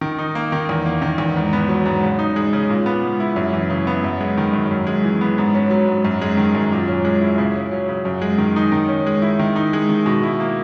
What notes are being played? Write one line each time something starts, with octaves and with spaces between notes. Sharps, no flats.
D#3
D#4
A#3
D#3
E2
A#3
D#3
E2
G#2
B3
F#3
G#2
C#3
D#4
G#3
C#3
A#2
B3
G#3
E4
F#2
E3
C#3
B3
F#2
G#3
D#3
F#2
F#2
G#3
E3
B3
G#2
C#4
F#3
G#2
F#2
G#3
D#3
F#2
A#2
C#4
G#3
E4
C#3
C#4
F#3
C#3
F#2
G#3
D#3
D#4
D#3
C#4
G#3
E4
D#3
D#4
G#3
D#3
B2
E4
A#3